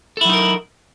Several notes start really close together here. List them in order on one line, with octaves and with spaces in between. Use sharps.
A4 E4 F#3 D#4 A#4